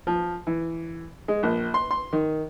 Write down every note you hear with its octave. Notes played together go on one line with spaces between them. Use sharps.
F3
E3
G#3
A#1
C6
C6
D#3